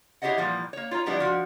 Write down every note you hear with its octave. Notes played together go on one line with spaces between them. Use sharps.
E4 G4 G#4 C#5 D#5 F#5
A#2 E3 F3 G3
A#3 C#5
F4 C#5 A#5
F3 G3 B3 D4 E4 D5
F3 F#4